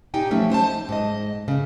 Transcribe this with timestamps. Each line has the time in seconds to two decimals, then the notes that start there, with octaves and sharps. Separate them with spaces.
0.14 A#2 D4 D#4 G4 G5 G#5
0.31 F3 F#3 A3 C#4
0.50 D#4 C5 G#5 A5
0.89 G#2 D#5
1.48 F#2 C#3